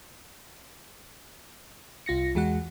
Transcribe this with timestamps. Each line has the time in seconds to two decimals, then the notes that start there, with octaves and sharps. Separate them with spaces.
2.06 C2 F4 A#6 C#7
2.35 E2 G#3 F#4 F#5